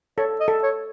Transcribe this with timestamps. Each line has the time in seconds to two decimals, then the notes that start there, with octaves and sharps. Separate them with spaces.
0.18 A4 C#5
0.40 D#5
0.48 A4
0.63 C#5